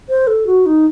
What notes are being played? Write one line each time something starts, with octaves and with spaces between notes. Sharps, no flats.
C5
A4
F#4
D#4